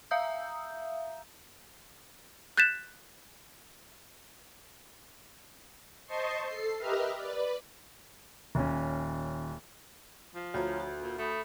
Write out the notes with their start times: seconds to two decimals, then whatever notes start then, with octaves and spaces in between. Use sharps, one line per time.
0.11 E5 F5 A#5 D#6 E6 G6
2.57 F#6 G6 A6 B6 E7
6.06 C5 D#5 A5 C6 C#6 C7
6.46 A4 C7
6.78 G4 A#4 B4 D#5 E5 F6
7.16 B4 D5
8.55 D#1 C#4
10.35 F3
10.54 D2 F4 C#5 A#5
10.80 F#4
11.02 A#2
11.18 A3 B5 D#6